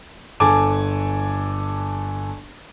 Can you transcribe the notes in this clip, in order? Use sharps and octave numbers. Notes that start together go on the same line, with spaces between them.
G1 A4 G#5 A5 D6